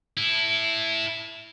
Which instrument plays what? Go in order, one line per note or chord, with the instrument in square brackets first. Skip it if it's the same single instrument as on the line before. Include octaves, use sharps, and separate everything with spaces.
[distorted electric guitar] E4 A4